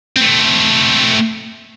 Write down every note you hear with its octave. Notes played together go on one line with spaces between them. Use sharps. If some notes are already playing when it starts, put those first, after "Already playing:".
A3 C4